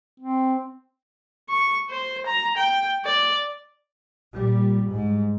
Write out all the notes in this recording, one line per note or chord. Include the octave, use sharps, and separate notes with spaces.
C4
C#6
C5
A#5
G5
D5
A#2 G3
G#2